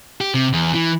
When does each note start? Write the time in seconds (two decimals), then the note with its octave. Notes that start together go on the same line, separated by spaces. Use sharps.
0.21 G4
0.34 C3
0.53 E2
0.74 E3